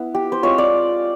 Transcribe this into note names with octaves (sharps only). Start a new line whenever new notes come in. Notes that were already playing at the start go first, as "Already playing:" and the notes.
Already playing: B3 E4
G4
C5
G#3 C4 F4 C#5
D5